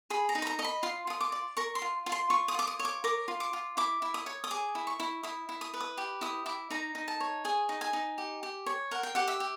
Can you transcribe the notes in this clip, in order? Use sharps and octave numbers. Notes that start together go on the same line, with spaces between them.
G#4 B5
A#5
D#4
B5
A#5
D#5 A#5
B5
F4 C6
F4 D#6
D6
D5
A#4 C#6
C6
F4
F4
C6
F4 C#6
D#6
F4 D6
D#6
C#5
D6
A#4 D6
F4
D6
F4
E4 D6
E4
D#6
C#5
D#6
G#4 D6
E4
C#6
E4
E4 D#6
E4
D#6
B4
D#6
G4
E4 D#6
E4 D6
D#4 A#5
D#4
A5
C#5
G#4 G#5
D#4
G#5
D#4
G4
G4
C#5
A#4 F#5
G5
G4 F#5
E5
G4